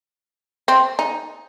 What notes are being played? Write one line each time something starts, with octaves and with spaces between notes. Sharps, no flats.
C4
D#4